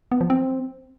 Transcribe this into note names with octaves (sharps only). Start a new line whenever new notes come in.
B3
F3
C4